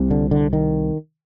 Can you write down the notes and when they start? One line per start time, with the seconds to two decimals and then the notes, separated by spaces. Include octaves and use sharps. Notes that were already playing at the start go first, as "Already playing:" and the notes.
Already playing: C2 C3
0.11 D3
0.31 D3
0.53 D#3